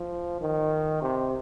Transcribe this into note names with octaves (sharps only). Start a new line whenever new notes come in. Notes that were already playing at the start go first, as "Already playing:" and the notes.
Already playing: F3
D#3
C3